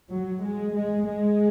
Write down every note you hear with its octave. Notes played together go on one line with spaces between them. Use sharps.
F#3
G#3
G#3
G#3